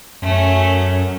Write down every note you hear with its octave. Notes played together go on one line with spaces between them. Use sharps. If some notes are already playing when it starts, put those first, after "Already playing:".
F#2 A3 C#4